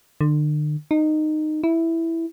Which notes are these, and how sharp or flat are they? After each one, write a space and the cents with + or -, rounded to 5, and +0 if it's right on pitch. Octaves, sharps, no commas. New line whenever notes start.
D3 +40
D#4 -15
E4 +0